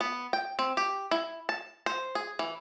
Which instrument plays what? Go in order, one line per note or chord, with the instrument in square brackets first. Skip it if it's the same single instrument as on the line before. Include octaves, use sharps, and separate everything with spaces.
[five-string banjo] B3
G5
C4
G4
E4
A5
C5
G#4
E3